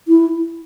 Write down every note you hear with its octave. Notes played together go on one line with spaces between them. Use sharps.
E4